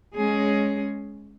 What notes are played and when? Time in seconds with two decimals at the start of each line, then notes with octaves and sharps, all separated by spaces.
0.16 G#3 C#4 G#4